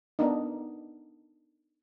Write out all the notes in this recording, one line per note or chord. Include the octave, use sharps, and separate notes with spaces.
B3 D4 D#4